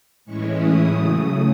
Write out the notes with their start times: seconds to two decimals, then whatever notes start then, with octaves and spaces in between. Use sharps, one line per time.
0.25 A2 E3 G#3 C#4 E4 C#6
0.55 D#6
0.85 C#3 F#3 A3 D#6